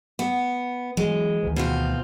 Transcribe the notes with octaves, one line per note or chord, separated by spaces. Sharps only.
B3
E3 F#3 G#3
D2 D#3 E3
B2 C4 F4